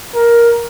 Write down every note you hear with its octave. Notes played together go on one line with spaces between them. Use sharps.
A#4